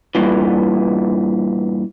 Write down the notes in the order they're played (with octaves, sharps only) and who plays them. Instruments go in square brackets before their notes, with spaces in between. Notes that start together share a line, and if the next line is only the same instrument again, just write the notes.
[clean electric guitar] G2 A#2 E3